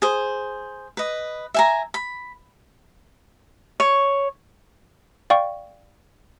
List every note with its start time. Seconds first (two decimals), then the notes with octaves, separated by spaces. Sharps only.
0.02 G#4 C5
0.97 B4 D#5
1.54 E5 G#5 A#5
1.94 B5
3.80 C#5
5.30 D5 F5 G5 C#6